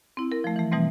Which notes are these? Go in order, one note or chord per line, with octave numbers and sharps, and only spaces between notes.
C4 E4
A#4
F3 A3
E3 A3
B2 E3 G3 A3 C4